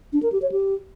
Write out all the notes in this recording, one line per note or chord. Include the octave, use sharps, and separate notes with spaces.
D4
A#4
G4
C#5
G4